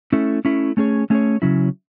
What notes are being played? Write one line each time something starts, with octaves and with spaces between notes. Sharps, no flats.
A3 C#4 E4
A3 C#4 E4
A3 C#4 G#4 C#5
A3 C#4 G#4 C#5
C#3 F#3 C#4 E4